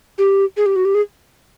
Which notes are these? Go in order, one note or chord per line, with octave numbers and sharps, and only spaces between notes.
G4
G#4
G4
F#4
G4
G#4